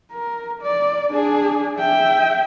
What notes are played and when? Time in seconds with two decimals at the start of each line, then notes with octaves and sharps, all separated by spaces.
0.12 A#4
0.62 D5
1.12 D4 G#4
1.78 E5 G5